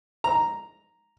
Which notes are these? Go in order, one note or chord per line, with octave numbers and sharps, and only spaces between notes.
A#5